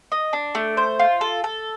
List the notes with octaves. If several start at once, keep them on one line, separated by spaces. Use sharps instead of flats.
D#5
D4
A3
C5
F4
A4
A4